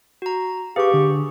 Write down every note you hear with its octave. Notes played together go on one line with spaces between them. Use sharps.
F#4 A#5
G4 G#4 B4 F5 C#6
D3